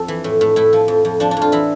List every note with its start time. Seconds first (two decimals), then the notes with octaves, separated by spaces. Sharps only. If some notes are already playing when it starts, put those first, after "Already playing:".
Already playing: F2 A4
0.08 E3
0.24 A2
0.41 A2
0.56 A2 E4
0.73 F3
0.88 F2
1.05 F2
1.20 F3 D4
1.31 D4
1.37 F2 F4
1.52 E3 E4